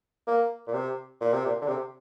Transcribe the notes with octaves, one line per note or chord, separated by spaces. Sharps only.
A#3
A#2
C3
A#2
C3
A#2
D3
C3